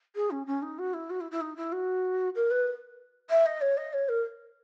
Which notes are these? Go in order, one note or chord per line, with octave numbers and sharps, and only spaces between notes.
G#4
C#4
C#4
D#4
F#4
E4
F#4
E4
E4
D#4
E4
F#4
A#4
B4
E5
D#5
C#5
D#5
C#5
A#4